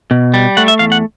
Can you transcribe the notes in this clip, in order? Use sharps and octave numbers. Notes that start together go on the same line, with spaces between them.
B2
G3
A3 F#5
E5
E2 F5
F#5